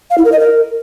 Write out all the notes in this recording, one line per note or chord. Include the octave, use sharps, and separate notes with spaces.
F5
E4
A#4
D#5
A#4